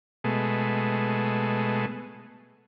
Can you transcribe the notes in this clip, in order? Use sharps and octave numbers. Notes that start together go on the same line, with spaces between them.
B2 G#3 A3